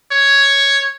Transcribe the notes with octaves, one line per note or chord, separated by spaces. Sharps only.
C#5